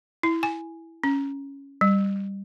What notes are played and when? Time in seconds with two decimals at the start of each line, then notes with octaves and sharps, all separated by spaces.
0.23 E4
0.43 G#5
1.04 C#4
1.81 G3